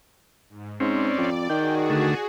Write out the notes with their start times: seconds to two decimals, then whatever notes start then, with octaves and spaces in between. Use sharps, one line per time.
0.49 G#2
0.80 G#2 C4 C#4 D5
1.18 F2
1.49 D#3 F#4 G#4 G5
1.90 D3 A3